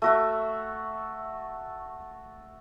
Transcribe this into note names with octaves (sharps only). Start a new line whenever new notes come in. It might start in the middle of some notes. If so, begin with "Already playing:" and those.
A3 F#4 E5